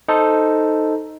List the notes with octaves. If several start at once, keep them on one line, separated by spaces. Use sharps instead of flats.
D#4 A4 C5